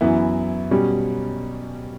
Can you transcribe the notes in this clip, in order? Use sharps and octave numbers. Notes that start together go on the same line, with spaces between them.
F#2 E3 B3 E4
B2 G3 C#4